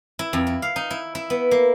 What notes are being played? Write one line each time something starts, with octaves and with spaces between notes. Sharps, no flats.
E4
F2
E4
F5
D#4
E4
E4
B3
A#3